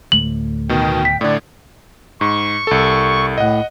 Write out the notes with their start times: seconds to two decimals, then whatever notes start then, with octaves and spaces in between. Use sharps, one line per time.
0.12 D2 A2 F#7
0.69 B2 D#3 G5
1.05 B6
1.21 A2 D3 D5
2.21 G#2 C#6
2.67 C2 A4
3.38 A2 D#5 F#5